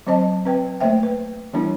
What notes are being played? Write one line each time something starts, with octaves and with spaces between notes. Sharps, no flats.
F#3 C4 C5 D#5 A5
C4 B4 G5
A3 A#3 C5 E5 G5
B4
E3 G3 B3 D4 E4